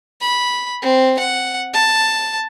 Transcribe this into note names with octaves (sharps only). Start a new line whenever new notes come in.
B5
C4
F#5
A5